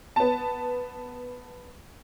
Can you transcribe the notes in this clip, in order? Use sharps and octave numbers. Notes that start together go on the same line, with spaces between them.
B3 A5